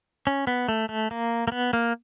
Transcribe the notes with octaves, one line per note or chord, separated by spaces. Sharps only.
C#4
B3
A3
A3
A#3
A#3
B3
A#3